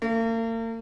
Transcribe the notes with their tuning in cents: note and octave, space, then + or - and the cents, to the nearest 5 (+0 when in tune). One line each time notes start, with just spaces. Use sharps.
A#3 -45